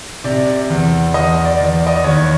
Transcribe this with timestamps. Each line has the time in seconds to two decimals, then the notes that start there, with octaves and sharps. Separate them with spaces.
0.24 C3 D5
0.70 E2
1.14 E2 D#5
1.45 D5
1.60 E2
1.74 D5
1.87 D#5
1.95 D5
2.04 D#2 C#5